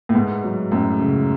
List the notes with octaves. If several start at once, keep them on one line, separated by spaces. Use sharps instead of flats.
A2
G#2 B3
F#3
F#2 A2
C#3